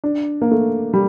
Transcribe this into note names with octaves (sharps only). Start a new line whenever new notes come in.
D4
A#3
A3
G3